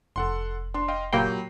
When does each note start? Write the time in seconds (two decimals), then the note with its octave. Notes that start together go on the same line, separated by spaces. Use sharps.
0.16 F1 A4 F#5 C6
0.74 D4 C6
0.88 D#5 F5 G5
1.13 A#2 F#3 A#3 G4 G5 B5 C7